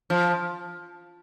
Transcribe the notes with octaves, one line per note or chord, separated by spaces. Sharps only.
F3